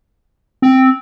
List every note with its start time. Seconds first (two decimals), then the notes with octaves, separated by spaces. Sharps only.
0.62 C4